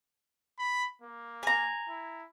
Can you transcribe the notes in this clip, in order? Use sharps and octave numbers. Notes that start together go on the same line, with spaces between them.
B5
A#3
G#5 A#5
E4